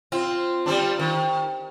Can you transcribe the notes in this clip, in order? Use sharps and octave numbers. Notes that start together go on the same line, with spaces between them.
C4 F4
G3 C4 D4
D#3